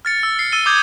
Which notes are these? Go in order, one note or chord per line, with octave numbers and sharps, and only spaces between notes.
F6 A6 C#7
E6
C7
E6 A6 D#7 G7
D6 D#6 G6 G#6